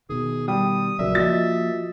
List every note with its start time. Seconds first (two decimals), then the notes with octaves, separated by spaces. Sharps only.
0.09 B2 D#3 G#4
0.48 G3 D#6
0.99 A#1 C#3 F#3 A#4 D5 E5
1.15 F3 A#3 F4 F#4 D#5 D#6 A6